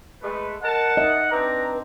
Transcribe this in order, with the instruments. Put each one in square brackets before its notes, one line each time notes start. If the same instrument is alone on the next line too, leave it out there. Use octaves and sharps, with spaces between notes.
[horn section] G#3 A3 [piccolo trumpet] B4
[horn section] A#4 A5 [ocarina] D#5 [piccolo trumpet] F#5
[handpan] D#5 [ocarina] E5
[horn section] C4 D4 [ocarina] B4 [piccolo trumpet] A#5